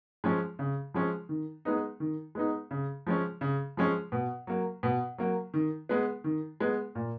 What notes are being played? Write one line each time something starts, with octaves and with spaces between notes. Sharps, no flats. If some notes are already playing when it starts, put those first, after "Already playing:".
F3 G#3 C#4
C#3
F3 G#3 C#4
D#3
G#3 B3 D#4
D#3
G#3 B3 D#4
C#3
F3 G#3 C#4
C#3
F3 G#3 C#4
B2
F#3 A#3
B2
F#3 A#3
D#3
G#3 B3
D#3
G#3 B3
A#2